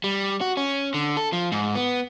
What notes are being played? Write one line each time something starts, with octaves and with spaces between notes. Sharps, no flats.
G3
F#4
C#4
D3
A4
F3
G#2
B3